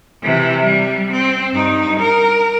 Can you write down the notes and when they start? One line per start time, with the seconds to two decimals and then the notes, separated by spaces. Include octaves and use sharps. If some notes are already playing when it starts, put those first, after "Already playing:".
0.23 C3 E3
0.64 G3
1.12 C4
1.53 G2 D#4
2.00 A#4